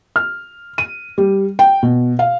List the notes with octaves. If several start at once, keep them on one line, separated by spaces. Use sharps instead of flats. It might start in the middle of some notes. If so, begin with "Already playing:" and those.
F6
D#7
G3
G5
B2
F5